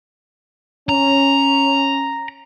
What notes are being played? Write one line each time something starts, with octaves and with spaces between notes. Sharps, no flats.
C#4 A#5